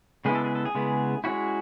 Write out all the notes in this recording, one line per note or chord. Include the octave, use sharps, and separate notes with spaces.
C#3 G#3 B3 E4 G#4
A4
G#4
A4
G#4
C#3 G#3 B3 E4
G#3 C#4 E4 F#4